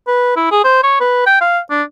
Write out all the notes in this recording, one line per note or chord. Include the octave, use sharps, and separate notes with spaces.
B4
E4
G#4
C5
C#5
B4
G5
F5
D4